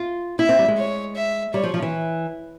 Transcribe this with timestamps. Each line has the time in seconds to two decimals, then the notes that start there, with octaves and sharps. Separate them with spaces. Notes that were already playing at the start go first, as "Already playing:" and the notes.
Already playing: F4
0.39 E4 E5
0.49 C4
0.59 G3
0.68 G#3
0.78 C#5
1.16 E5
1.54 G3 C#5
1.63 F3
1.74 F3
1.82 E3